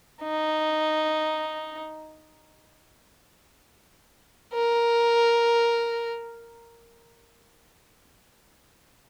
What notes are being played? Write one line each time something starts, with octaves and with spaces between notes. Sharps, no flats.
D#4
A#4